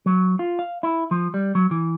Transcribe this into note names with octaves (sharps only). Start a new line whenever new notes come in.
F#3
F4
F5
E4
F3
G3
F#3
E3